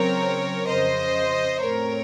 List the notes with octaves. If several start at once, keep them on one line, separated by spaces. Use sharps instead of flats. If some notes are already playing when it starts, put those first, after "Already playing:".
Already playing: C#3 F#3 C4 A#4 C#5
F2 C#3 F3 C5 D#5
A2 A3 C4 A#4 C#5